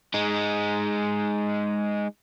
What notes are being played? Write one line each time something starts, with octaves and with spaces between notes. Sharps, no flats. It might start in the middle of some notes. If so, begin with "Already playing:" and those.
G#3 D#4